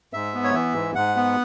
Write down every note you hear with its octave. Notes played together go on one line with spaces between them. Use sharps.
G#2 E5
B3
C#5
E3 E5
G#2
G#2 F#5
B3